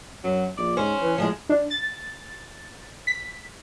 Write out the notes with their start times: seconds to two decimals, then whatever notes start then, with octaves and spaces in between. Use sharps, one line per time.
0.24 F#2 F#3
0.57 A#1 D5
0.77 G#2 C#4 C5
1.02 E3
1.18 A2 F3 F#3 G#3
1.49 D4
1.70 A6
3.07 B6